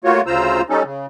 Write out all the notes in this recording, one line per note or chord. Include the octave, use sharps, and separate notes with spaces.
A3 A#3 F4 F#4 C#5
D2 C#3 F4 C5 A#5 E6
G3 C#4 D#4 A4
C#3